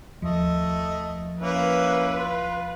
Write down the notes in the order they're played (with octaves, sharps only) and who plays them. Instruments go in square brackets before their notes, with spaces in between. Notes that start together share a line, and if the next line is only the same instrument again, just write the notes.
[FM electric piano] D#2 F3 [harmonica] A3 D#5
[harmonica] A#3 C#4 E4 [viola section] B4
[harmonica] F4